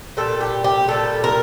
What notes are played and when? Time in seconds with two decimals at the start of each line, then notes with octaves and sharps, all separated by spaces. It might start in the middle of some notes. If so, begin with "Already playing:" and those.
0.17 A#2 G3 A4
0.41 G4
0.64 G4
0.87 A#2 G3 A4
1.24 A#4